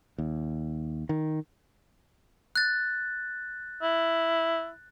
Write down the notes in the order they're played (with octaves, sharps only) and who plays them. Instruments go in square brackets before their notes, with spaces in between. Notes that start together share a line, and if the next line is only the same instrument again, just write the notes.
[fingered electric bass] D#2
D#3
[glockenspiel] F#6 A6
[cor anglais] E4